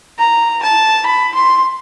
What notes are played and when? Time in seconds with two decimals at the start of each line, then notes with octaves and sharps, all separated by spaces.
0.19 A#5
0.63 A5
1.06 B5
1.35 C6